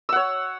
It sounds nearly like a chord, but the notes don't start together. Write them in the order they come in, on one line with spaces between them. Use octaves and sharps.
E6 F#5 C#5